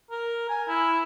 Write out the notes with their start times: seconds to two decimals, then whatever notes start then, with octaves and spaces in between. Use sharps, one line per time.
0.11 A#4
0.50 G#5
0.68 E4